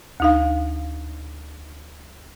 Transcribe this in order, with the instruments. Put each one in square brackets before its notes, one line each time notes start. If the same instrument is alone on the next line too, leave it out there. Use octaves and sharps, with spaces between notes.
[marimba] D2 D#4 F5